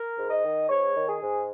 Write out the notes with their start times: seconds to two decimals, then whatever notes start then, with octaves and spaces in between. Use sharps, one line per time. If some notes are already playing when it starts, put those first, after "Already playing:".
Already playing: A#4
0.17 G#2
0.30 D#5
0.43 D#3
0.68 G#2 C#5
0.95 D#3
1.08 G#4
1.22 G#2